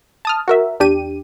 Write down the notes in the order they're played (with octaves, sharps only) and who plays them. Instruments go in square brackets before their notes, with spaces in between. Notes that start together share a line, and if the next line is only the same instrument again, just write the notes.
[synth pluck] A5 D#6 F6
F#4 A#4 E5
E2 D4 G4 D#7